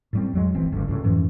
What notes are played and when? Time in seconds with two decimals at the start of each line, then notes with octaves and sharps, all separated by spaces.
0.13 A2 G3 C4
0.33 F2 F#3 G#3
0.54 D1 G1 E3 C4
0.72 F#1 C#2 G2 D3
0.88 C#2 A2
1.04 F2 G#2 E3 C#4